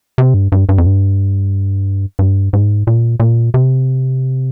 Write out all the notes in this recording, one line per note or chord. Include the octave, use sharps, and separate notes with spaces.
C3
G2
G2
G2
F2
G2
G2
G#2
A#2
A#2
C3